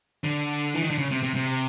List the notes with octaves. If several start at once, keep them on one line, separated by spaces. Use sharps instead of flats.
D3
E3
D#3
D3
C#3
C3
C3
C3